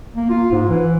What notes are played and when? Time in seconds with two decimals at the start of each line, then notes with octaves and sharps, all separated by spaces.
0.16 A#3
0.30 F4
0.51 G#2
0.69 E3